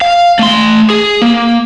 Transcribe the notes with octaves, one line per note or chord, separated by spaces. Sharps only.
F5
A3 C6
G#4
A#3